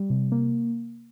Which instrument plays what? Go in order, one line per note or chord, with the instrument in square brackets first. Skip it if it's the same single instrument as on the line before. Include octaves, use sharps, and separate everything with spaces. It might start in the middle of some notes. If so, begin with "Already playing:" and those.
Already playing: [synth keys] G3
C3
A#3